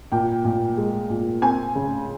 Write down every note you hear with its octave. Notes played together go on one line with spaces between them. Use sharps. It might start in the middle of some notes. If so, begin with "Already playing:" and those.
A#2 G5
A#2
G#3
A#2
C4 G#5
C#3